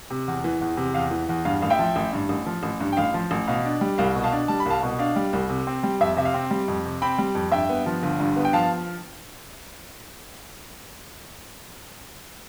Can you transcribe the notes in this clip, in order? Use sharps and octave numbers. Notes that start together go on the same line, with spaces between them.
C3
E2
E3
E2
C3
E2 F5
E3
E2
G2 F5
A1 F5
E5 G5
F3
A1
G2
A1
F3
A1
G2
G5
A1 F5
F3
A1
B2 F5
D4
G3
C2 F5
B2
F5 A5
D4
G3 A5
B5
C2 F5 A5
B2
D4 F5
G3
C2
C3
C4
G3
F2 E5
C3 E5
F5
C4
G3
F2
C3
C4 G5 B5
G3
F2
G2 E5 G5
B3
F3
G1
G2
B3
G5
F3 F5 A5